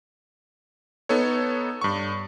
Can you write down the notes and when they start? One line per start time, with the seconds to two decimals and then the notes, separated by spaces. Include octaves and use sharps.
1.09 B3 D#4 A4 C#5
1.81 G2 C#6